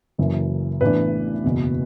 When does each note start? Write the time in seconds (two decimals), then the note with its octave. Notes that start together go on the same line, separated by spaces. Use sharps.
0.18 F#1 F#2 E3
0.81 A1 A2 E3 B3 D4 B4
1.44 F#1 E2 B2